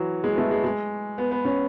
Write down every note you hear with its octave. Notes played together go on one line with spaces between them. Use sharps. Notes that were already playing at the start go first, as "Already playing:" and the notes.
Already playing: E3 F#3
G#3
B3
A3
G#3
G#3
B3
B3
C#4